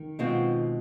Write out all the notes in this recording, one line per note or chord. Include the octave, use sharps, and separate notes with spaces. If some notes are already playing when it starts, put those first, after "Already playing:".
Already playing: D#3
B2 G#3 C4 F4